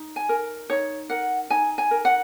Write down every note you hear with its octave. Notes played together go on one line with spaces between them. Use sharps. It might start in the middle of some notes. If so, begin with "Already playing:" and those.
Already playing: D#4
G#5
A#4
D#4 C#5
A#4 F#5
D#4 G#5
G#5
A#4
F#5